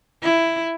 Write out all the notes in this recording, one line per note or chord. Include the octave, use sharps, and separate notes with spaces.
E4